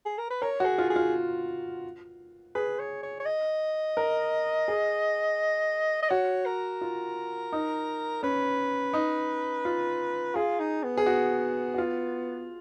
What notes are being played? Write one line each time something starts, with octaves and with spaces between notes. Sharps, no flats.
G#4
A#4
B4
A#4 C#5
F#4
G#4
F4
G#4
F4
G#4 B4
C#5
C#5
C#5
D#5
A#4
G#4
D#5
F#4 C#5
A#4
F4
D#4
C#4 B4
D#4
F4
F4 G#4
D#4
B3
G#4
F#4
F#4
F4